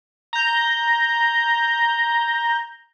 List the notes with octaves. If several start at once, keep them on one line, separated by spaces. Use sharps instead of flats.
A#5 G6